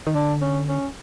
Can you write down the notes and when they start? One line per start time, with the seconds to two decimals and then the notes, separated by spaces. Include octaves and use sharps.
0.07 D#3
0.15 D3 D4
0.41 C#4
0.69 C#4